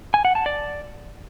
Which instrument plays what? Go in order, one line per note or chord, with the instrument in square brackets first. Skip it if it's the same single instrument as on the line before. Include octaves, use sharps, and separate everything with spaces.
[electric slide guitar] G#5
F#5
A5
D5